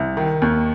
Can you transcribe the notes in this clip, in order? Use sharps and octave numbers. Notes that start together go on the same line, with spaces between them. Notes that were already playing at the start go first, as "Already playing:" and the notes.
Already playing: C2
D#3
D#2